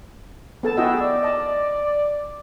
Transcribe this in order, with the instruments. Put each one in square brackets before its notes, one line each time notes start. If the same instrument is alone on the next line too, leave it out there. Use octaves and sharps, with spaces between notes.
[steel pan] B3 A4 A5
[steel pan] E4 F#4 D#5 [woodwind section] G#4 G5 E6
[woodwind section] D5
[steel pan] D#5 A5